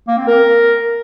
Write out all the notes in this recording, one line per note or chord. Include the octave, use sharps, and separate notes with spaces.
A#3
C4
A#4